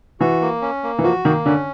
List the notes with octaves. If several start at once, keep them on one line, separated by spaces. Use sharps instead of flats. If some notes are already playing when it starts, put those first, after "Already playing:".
E3 F#4
A#3
C#4
A#3
E3
F3 F#4
D#3 A#3
D3 C#4